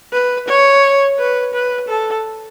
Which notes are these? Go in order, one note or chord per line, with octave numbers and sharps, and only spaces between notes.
B4
C#5
B4
B4
A4